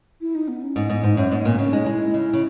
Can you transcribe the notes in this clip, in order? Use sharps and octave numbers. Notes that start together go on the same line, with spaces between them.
E4
D#4
B3
C#4
G#2
G#2 B3
G#2 D#4
F#2 C#4
G#2 A#3
A#2 B3
D#4
C#3 C#4
G#3 D#4
G#3 E4
C#3
C#3